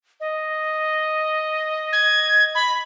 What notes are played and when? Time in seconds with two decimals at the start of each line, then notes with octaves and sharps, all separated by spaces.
0.20 D#5
1.92 G#6
2.55 B5